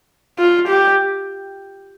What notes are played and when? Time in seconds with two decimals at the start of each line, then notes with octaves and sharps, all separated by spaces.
0.39 F4
0.68 G4